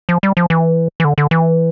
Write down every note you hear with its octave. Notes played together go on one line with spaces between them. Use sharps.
F3
G3
F3
E3
E3
D3
D3
E3